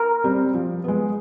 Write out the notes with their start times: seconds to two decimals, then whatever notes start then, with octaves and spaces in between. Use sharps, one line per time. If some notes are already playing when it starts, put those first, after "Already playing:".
Already playing: A#4
0.24 G3 C4
0.54 F3
0.84 G#3 B3